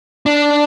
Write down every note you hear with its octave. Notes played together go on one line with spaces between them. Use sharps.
D4